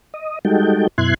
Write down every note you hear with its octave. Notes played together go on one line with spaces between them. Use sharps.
D#5
G3 G#3 D#4 F#4 A4 G5
F#2 B2 E4 C6 F#6 G#6